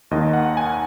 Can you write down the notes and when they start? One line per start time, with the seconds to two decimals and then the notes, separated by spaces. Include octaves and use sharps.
0.11 D#2 D#3 D#5
0.33 F#5
0.57 G#5